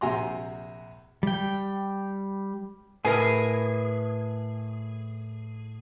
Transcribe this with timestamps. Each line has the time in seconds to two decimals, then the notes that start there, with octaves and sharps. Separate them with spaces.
0.01 A#1 C3 F#4 G#5 A#5 C6
1.23 G3 G5
3.05 A2 G#4 A#4 B4 G#5